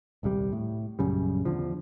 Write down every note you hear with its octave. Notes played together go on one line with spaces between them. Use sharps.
D#1 C2 C3 G3
A2
A#1 F#2 C#3 G3
E2 D3 F3